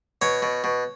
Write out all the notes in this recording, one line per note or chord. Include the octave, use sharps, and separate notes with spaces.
B2 C#5
B2
B2